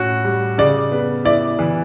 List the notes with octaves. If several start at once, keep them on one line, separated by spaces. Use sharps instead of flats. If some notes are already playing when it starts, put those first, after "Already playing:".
Already playing: A2 C#4 F#4
G3
C#3 D5
B3
E4 D5
E3